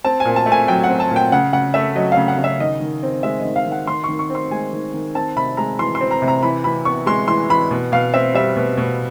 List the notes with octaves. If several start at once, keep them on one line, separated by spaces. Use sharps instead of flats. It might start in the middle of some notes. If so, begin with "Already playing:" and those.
C4 A5
G#5
A#2
A5
A3
G#5
F#3 G5
F#5
C4
A5
A#2
G5
C#3 F#5
C#3 F#5
A3 E5
F#3 D#5
C#3 F5
F#5
C#3
E5
D#3 D#5
D#3
C4
G#3 E5
D#5
D#3
F5
D#3
F#5
D#3 C6
D#3 C#6
C#6
C4
C6
G#3 G#5
D#3
D#3
C4 A5
C3 B5
G#3 A#5
E3 C6
C6
C4
A#5
C3
A#5
E3 B5
E3 B5
B3 C#6
G#3 C6
E3 C6
E3 B5
B2
B2 F5
C4 E5
G3 E5
B2
B2